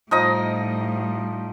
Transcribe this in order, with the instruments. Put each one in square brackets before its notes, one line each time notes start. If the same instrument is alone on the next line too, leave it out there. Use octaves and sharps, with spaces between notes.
[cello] A2 G3 [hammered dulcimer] F3 D#4 D#5